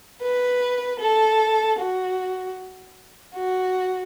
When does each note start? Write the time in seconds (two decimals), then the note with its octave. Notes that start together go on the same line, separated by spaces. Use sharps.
0.22 B4
1.00 A4
1.79 F#4
3.35 F#4